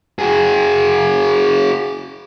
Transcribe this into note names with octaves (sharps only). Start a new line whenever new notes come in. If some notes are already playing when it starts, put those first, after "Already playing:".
F#4 G#4